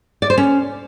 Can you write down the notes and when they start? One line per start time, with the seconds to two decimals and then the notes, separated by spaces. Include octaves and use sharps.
0.22 D5
0.30 C5
0.38 C#4